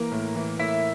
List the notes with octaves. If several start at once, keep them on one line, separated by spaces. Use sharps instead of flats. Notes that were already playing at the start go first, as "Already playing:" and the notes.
Already playing: E3 A#3 A#4
A2
E3
A2 E4 E5